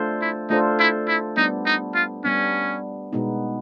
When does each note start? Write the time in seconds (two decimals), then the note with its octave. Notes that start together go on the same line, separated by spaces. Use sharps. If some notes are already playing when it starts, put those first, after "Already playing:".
Already playing: A3 D4 F4 A4 C5
0.21 E4
0.50 A3 D4 D#4 F4 A4 C5
0.79 E4
1.08 E4
1.37 G3 B3 D4 D#4
1.66 D#4
1.95 F4
2.24 G3 B3 C#4 D4
3.12 B2 G#3 B3 D#4